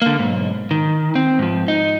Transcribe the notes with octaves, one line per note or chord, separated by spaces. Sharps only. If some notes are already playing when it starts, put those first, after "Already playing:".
D3 A#3
B1 G#2
D#3
C4
G#2 F3
D#4